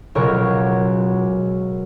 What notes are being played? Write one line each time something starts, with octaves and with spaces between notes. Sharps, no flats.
C#2 B2 F#3 A#4 C#5